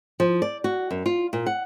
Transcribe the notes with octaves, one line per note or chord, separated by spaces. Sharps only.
F3
D5
F#4
F#2
F4
A#2
F#5